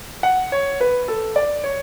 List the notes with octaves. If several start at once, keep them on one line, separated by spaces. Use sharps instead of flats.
F#5
C#5
B4
A4
D5
C#5